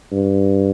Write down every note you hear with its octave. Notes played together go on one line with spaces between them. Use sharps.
G2